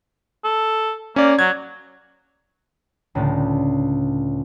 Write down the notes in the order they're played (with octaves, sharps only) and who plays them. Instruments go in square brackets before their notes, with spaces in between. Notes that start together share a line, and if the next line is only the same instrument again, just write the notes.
[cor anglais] A4
[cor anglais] A#3 [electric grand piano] C#4 D5
[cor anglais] F#3 [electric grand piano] G#6
[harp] C#2 A2 D3 A3